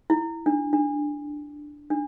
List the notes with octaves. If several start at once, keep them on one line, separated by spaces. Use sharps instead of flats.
E4
D4
D4
D4